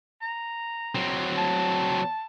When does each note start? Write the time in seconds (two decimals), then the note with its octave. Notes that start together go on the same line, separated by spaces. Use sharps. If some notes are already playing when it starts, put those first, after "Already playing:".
0.22 A#5
0.95 F#3 C4
1.38 A5